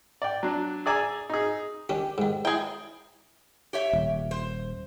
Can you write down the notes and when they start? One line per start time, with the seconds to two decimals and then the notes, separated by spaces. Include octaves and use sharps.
0.22 D5 G5
0.43 F#3 D4
0.86 G#4 D5 G#5 A#5 E6
1.29 D#4 G#4
1.89 D#3 C#4 D4 G4
2.18 G#2 D#3
2.45 E4 G#4 G5
3.73 G4 C#5 E5
3.93 D#1
4.31 C5